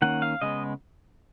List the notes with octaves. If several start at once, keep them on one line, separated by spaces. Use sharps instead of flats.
D#3 A#3 C#4 F#5
F5
C#3 G#3 B3 D#5